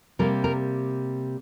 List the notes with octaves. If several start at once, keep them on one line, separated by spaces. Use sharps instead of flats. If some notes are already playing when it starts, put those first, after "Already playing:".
C3 G3 A#3 A#4
A#4